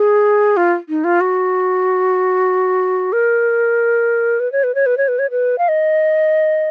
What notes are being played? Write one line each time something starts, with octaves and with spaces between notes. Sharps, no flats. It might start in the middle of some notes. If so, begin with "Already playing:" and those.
Already playing: G#4
F4
D#4
F4
F#4
A#4
B4
C#5
B4
C#5
B4
C#5
B4
C#5
B4
F5
D#5